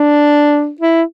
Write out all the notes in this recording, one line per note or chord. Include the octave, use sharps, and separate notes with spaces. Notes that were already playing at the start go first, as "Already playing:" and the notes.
Already playing: D4
E4